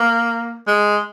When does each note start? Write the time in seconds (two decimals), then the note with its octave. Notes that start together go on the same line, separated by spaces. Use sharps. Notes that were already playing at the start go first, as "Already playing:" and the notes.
Already playing: A#3
0.67 G#3